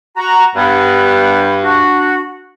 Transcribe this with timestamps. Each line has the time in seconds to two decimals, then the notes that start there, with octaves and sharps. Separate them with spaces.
0.17 F#4 A#5
0.56 G2 B3 F#5 B5
1.63 D4 F#4